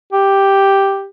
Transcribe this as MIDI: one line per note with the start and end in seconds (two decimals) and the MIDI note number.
0.13 1.06 67